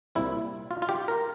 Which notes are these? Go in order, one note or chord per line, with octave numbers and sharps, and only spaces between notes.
C2 A#2 G3 C4 E4
F4
F4
G4
A#4